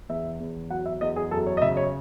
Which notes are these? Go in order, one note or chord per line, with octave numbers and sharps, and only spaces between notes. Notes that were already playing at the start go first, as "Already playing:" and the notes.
E2 E5
E2
F#3 F#5
E5
E2 D#5
G#4
F#2 A4
C#5
D#5
C#3 E5
C#5